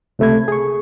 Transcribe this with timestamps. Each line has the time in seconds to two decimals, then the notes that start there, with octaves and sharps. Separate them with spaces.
0.19 C#2 C3 A3 B5 G#6
0.48 G#4 C#6